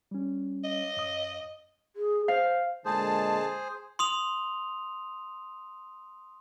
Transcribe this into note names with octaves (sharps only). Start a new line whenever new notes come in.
G3 C#4
D#5
F#2 D#6
G#4
C5 F5
A#2 D3 G#3 G#4 C5 A5
C6 D#6 F7